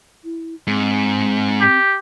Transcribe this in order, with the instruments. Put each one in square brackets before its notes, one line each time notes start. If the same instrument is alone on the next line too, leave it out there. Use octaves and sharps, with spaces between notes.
[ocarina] E4
[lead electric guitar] G#2 [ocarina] C4
[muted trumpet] G4